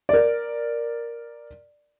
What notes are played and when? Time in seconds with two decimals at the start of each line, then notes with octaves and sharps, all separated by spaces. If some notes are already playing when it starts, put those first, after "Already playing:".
0.09 A#4 D5